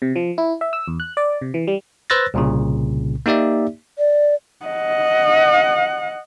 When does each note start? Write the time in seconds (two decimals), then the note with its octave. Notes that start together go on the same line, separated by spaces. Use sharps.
0.02 C3
0.16 F3
0.38 E4
0.61 E5
0.73 E6
0.88 E2
1.00 F#6
1.17 D5
1.41 C3
1.54 E3
1.67 G3
2.10 B4 C5 E6 F#6 A6 A#6
2.34 C2 A#2 C#3
3.26 A#3 D#4 G4 D5 E5
3.99 D5
4.66 D#5 F#5